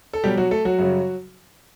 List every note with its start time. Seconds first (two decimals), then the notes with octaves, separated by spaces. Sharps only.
0.13 A4
0.24 B2 F#3 G3 G4
0.37 F#3 F#4
0.51 A3 A4
0.65 F#3 F#4
0.78 F#2 C#3 G3